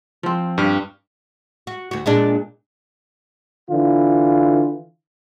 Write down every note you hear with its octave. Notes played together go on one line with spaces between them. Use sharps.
F3 C4
G2 G4 F6
F#4
D2 F#4
A#2 G#3 D4
D3 E3 F4